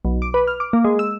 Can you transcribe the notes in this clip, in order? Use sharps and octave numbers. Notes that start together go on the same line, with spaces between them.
B1
D6
B4
F6
D6
A#3
G#3
E6